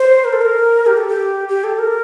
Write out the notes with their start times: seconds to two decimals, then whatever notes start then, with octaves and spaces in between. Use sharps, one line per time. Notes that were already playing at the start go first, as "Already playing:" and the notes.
Already playing: C5
0.25 A#4
0.33 A4
0.41 A#4
0.87 G4
0.97 A4
1.08 G4
1.48 G4
1.64 A4
1.79 A#4